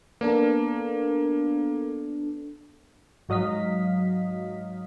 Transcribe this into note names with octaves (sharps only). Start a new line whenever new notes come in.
A#3 B3 D4 A4
G#2 F#3 D#5 F5 B6